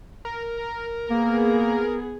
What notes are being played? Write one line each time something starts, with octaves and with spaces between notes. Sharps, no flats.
A#4
A#3 B3 G#4